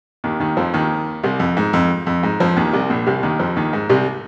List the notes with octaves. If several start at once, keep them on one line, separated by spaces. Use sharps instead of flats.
D#2 D#3
D#2 D#3
F2 F3
D#2 D#3
C2 C3
F2
G#2
F2
F2
G#2
F2 F3
D#2 D#3
C2 C3
A#1 A#2
C2 C3
D#2 D#3
F2 F3
D#2 D#3
G#2
C2 C3